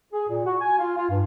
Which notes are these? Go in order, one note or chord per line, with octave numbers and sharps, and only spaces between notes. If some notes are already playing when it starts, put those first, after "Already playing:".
G#4
A#2
F#4
G#5
F4
F4
G2